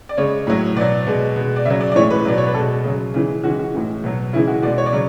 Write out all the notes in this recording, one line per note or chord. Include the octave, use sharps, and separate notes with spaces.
D5
C#3 G#3 C#5
A2 F#3
B2 F#3 D5
B2 G#3
B2 G#3
D5
C#3 E5
F#3
D5
D5
A2 E3 G#3 C#5
B4
B2 F#3 D5
C#5
B4
B2 G#3 A4
C#3 F#3 G#4
C#3 E3 G#3
C#3 E3 G#3 F#4
F#4
A2 E3 G#3
B2 F#3
C#3 E3 G#3 E4
F#4
B2 G#3 D5
C#5
D5
C#3 F#3